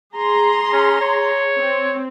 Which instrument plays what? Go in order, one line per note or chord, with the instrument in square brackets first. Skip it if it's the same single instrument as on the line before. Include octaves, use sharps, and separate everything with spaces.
[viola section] G#4 A#5 C6
[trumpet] C#4
C#5
[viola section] C4